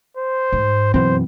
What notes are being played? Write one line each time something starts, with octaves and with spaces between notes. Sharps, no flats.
C5
G#2
F#2 B2 E3 C4 C5